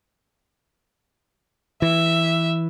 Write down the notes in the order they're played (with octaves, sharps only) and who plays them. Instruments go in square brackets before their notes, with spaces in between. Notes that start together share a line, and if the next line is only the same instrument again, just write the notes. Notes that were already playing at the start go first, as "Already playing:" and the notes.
[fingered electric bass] E3 [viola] E5